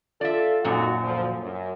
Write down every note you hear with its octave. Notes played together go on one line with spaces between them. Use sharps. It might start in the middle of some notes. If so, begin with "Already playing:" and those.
F4 A4 D5 E5
F#2 A#2 C4 D#4 F#4
D2 F3
F#2